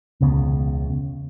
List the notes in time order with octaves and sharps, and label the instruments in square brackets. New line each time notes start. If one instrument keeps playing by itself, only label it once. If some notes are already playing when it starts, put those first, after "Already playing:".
[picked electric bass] E1 C#2 C#3 B3